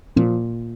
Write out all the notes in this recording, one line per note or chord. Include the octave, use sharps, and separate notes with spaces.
A#2 F3